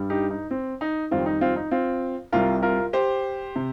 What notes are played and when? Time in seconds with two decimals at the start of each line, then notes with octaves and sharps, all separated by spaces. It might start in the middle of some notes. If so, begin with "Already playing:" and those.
Already playing: G2 G3
0.10 D#4 G4
0.31 D#4
0.51 C4
0.81 D#4
1.11 F2 D#3 G3 C4 F4
1.26 D#4
1.41 C4 F4
1.56 D#4
1.71 C4 F4
2.32 C2 C3 G3 F4 A#4
2.63 F4 A#4
2.93 G4 C5
3.56 C3